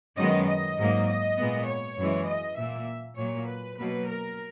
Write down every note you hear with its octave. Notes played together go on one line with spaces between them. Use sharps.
F#2 D#3 G#3 B3 D#5
D#5
G#2 F#3 A#3
D#5
A#2 G#3 B3
C#5
F#2 E3 G#3
D#5
A#2 A#3 E5
A#2 F#3 A#3 C#5
B4
B2 F#3 A#3 B4
A#4